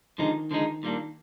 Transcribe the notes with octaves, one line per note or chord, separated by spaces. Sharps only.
D3 D#3 F3 G#3 D#4
D3 F3 G#3 D#4
A#2 G3 A#3 D4